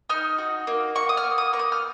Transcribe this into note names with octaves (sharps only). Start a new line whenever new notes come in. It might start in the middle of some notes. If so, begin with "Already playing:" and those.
D#4 F6
F#4
A#3
F#4 C#6
D#6
F6
A#3
D#6
A#3 C#6
D#6
F6